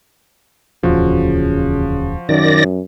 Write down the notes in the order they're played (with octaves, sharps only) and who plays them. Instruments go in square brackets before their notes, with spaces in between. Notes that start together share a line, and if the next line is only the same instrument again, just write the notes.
[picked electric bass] D1 E2 A#2 [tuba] C#3 [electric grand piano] F3 F#4
[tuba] F#2 [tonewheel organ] D#3 D5 A#6